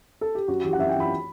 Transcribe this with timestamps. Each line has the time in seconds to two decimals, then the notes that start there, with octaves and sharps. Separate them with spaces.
0.21 A4
0.35 G4
0.48 F#2 F#4
0.64 E3 G4
0.73 F#5
0.79 F#2 E5
0.89 G5
0.94 E3
1.00 B5